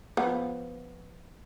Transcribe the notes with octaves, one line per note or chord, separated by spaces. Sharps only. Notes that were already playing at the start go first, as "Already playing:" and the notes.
F3 B3